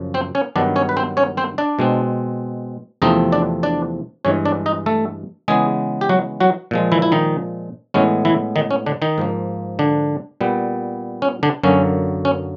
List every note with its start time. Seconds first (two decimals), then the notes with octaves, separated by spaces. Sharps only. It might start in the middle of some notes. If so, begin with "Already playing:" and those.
Already playing: F#2 C#3 F3
0.14 C4 C5
0.35 C#4 C#5
0.56 G2 D#3 F#3 B3 D4 D5
0.76 C#4 C#5
0.89 B4
0.97 C4 C5
1.17 C#4 C#5
1.37 C4 C5
1.58 D4 D5
1.79 B2 G#3 C4
3.02 E2 C3 F3 A3 C4 D#4 D#5
3.32 D4 D5
3.63 D4 D5
4.25 G2 E3 G#3 C#4 C#5
4.45 D4 D5
4.66 D#4 D#5
4.86 A3 A4
5.48 C#3 E3 G#3 B3 G#4
6.01 G4
6.09 F#3 F#4
6.40 F#3 F#4
6.71 A#2 F3 G#3
6.92 E3 E4
7.02 E4
7.12 D#3 D#4
7.94 A2 E3 G#3 B3 C#4
8.25 E3 E4
8.56 D#3 D#4
8.71 C#4
8.86 D3 D4
9.02 D#3 D#4
9.18 G#2 F3 A#3
9.79 D3 D4
10.41 A#2 G3 B3
11.22 C#4
11.43 D3 D4
11.63 F#2 D3 F#3 A#3 C#4
12.25 C#4